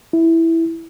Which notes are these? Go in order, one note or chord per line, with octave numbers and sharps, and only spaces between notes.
E4